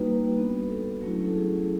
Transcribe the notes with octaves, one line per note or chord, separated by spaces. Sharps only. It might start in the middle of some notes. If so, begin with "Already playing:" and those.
Already playing: G3 A#3 D#4 F#4 B4
B3 D4 F#4
A4
F#3 A3 C#4 E4
A4
G#4